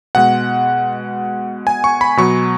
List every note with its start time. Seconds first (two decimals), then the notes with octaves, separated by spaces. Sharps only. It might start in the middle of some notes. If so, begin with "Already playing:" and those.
0.15 B2 G#3 F#5
1.67 G#5
1.84 C#6
2.01 B5
2.17 B2 F#3 C#6